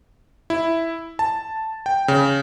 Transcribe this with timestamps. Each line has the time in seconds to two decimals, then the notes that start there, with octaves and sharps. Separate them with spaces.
0.50 E4
1.19 A5
1.86 G5
2.08 C#3